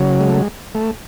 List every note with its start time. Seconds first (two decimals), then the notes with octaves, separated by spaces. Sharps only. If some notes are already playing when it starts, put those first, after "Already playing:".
Already playing: C#3 F#3
0.21 G#3
0.29 A3
0.37 G#3
0.75 A3